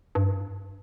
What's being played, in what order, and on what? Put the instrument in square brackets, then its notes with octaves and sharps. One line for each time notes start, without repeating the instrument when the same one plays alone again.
[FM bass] G2